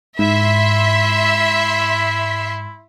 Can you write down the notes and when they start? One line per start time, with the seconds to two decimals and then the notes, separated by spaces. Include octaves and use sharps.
0.19 G#2 E4 E5 C6